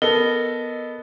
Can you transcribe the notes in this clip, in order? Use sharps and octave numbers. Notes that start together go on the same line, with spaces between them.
B3 A4 A#4 D#5